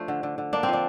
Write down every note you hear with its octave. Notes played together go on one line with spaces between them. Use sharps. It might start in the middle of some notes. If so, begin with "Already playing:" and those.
Already playing: F3 A3 D4 C5
D3
D3
D3
A#3 D4
C4
F3 D4